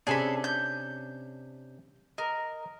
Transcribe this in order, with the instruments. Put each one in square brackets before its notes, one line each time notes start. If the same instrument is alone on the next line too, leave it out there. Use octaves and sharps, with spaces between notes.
[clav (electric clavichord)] C3 C#4 D4 [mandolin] G#4 A4 B5
[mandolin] G6
[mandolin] A#4 [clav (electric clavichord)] D#5